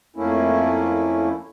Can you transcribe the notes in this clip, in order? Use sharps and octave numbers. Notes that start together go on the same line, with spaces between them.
F2 A3 A#3 C#4 E4